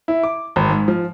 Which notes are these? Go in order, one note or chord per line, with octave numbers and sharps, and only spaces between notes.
E4
D6
G#1
G#2
F3